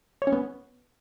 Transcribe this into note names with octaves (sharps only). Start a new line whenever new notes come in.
C#5
C#4
B3